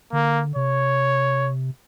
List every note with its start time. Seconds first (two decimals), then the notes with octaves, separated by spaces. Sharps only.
0.13 D3 A#3
0.56 C3 C#5